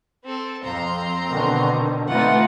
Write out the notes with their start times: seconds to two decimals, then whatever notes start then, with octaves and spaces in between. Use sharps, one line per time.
0.25 C4 A4
0.63 F2 C4 A#5 C6
1.29 B2 D3 D#3
2.08 E3 A3 C4 D#4 F4 F#5